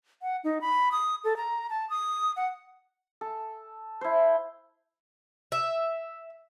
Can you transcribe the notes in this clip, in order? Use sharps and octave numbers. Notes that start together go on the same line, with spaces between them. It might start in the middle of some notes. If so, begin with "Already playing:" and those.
F#5
D#4
B5
D#6
A4
A#5
A5
D#6
F#5
A4
E4 C5
E5